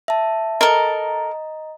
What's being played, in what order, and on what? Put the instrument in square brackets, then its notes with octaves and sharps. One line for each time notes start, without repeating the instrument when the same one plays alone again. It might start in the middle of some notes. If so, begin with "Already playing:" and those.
[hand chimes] E5 A5
[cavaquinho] A4 A#4 [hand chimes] D#5 A#5